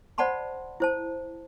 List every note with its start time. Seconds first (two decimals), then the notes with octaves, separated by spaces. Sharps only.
0.18 C5 D5 F#5 A5 B5 C6
0.80 E4 C5 A5